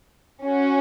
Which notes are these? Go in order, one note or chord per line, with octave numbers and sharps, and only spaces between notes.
C#4 F#4